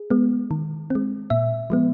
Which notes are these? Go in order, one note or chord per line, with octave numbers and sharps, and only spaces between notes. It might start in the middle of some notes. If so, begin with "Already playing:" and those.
Already playing: G#4
G#3 B3
D#3
G#3 C4
A#2 E5
F3 G#3 B3